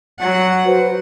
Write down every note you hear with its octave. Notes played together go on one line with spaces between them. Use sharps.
F#3 F#5
F#4 B4 C5